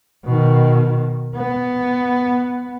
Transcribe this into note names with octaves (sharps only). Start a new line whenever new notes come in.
B2 D#3
B3